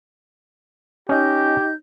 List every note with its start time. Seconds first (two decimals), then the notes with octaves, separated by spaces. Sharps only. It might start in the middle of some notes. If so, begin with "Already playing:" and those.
1.09 C#4 D#4 G4 D#5 G6